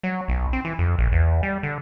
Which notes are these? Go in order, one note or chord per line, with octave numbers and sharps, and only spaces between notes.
F#3
B1
C4
E3
F2
A#1
E2
G3
D3